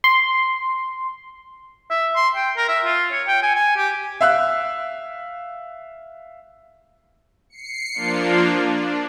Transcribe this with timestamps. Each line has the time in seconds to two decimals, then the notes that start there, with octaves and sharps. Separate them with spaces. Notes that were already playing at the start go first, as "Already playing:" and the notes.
0.04 C6
1.91 E5
2.16 C6
2.35 G5
2.57 A#4
2.69 E5
2.84 F4
3.12 C#5
3.28 G5
3.43 G#5
3.56 G#5
3.77 G4
4.21 E5 F5 E6 F#6
7.50 C7 C#7
7.94 F3 A#3 D4 F4
8.71 D4